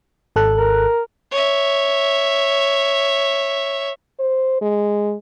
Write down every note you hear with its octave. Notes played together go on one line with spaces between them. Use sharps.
G#1 A4 F#6
A#4
C#5 E5
C5
G#3